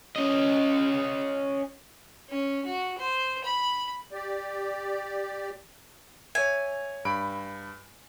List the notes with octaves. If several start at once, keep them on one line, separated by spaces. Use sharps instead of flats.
C#4 D#5
C#4
F#4
C5
B5
G4 D5
C#5 E5 G#5
G2 B5 D7